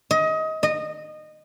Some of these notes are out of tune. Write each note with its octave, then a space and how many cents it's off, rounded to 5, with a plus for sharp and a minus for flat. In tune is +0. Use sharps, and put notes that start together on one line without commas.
D#5 +25
D#5 -20